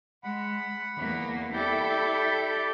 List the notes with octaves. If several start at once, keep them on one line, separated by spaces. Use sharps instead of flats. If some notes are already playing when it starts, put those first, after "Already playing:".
G#3 F#5 B5
E2 A#3
E4 G4 A4 D5 G6